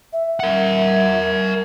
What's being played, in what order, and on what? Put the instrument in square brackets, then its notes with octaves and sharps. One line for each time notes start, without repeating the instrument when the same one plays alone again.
[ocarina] E5
[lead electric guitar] A#4 F#5